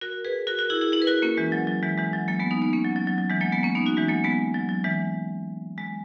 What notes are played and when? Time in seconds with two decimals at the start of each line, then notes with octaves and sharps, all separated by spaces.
0.01 F#4 A#4
0.25 G#4 B4
0.47 F#4 A#4
0.58 F#4 A#4
0.70 E4 G#4
0.81 E4 G#4
0.92 E4 G#4
1.02 B4
1.07 F#4 A#4
1.22 A#3 C#4
1.37 E3 G#3
1.52 F#3
1.67 F#3
1.83 E3 G#3
1.98 E3 G#3
2.13 F#3
2.28 F#3 A#3
2.40 G#3 B3
2.51 B3 D#4
2.62 B3 D#4
2.73 A#3 C#4
2.84 F#3
2.96 F#3
3.07 F#3
3.18 F#3
3.30 E3 G#3
3.41 F#3 A#3
3.52 G#3 B3
3.63 A#3 C#4
3.75 B3 D#4
3.86 D#4 F#4
3.97 E3 G#3
4.08 F#3 A#3
4.24 G#3 B3
4.54 F#3
4.69 F#3
4.84 E3 G#3
5.78 G#3